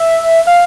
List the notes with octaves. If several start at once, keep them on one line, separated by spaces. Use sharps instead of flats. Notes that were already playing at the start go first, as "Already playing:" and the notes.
Already playing: E5
F5